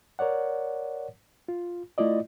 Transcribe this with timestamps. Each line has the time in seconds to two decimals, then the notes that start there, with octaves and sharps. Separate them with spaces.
0.19 A#4 C#5 D5 F#5
1.48 F4
1.98 A3 E4 F4 D5 D#5